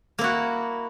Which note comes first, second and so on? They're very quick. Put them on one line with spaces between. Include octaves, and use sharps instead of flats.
A#3 E4 F#4